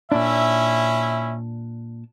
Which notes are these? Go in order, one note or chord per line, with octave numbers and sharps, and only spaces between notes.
A#2 C#4 D4 E4 E5